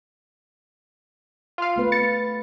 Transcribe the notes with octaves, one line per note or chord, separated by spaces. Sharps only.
F4 F5
A3 B3 B4
A6 C#7